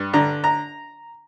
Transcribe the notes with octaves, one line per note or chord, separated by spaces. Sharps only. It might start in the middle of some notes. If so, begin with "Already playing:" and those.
Already playing: G2
D3 A#5
A#5